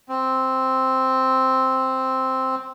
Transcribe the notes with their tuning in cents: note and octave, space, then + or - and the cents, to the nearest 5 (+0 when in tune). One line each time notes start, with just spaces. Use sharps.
C4 +0